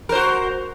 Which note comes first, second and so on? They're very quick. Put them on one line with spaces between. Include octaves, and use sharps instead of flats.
A#4 C5 F#4